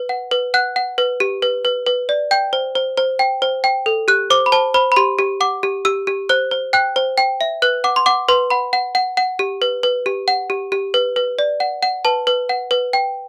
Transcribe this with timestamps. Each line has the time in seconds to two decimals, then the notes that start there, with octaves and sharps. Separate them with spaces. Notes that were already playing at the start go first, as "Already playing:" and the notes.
Already playing: B4
0.09 F#5
0.31 B4
0.54 F#5 F#6
0.76 F#5
0.98 B4
1.20 G4
1.42 B4
1.65 B4
1.86 B4
2.09 D5
2.31 G5 G6
2.53 C5
2.75 C5
2.97 C5
3.19 G5
3.42 C5
3.64 G5
3.86 A4
4.08 G4 F#6
4.30 C5 D6
4.46 B5
4.52 C5 A5
4.74 C5 B5
4.92 B5
4.96 G4 C6
5.19 G4
5.41 F#5 D6
5.63 G4
5.85 G4 E6
6.07 G4
6.29 C5 F#6
6.51 C5
6.73 G5 F#6
6.96 C5
7.18 G5
7.41 E5
7.62 B4 F#6
7.84 F#5 D6
7.96 C6
8.06 F#5 D6
8.28 B4 C6
8.50 F#5 B5
8.73 F#5
8.95 F#5
9.17 F#5
9.39 G4
9.62 B4
9.83 B4
10.06 G4
10.28 F#5
10.50 G4
10.72 G4
10.94 B4
11.16 B4
11.39 D5
11.60 F#5
11.83 F#5
12.05 B4 A5
12.27 B4
12.49 F#5
12.71 B4
12.93 G5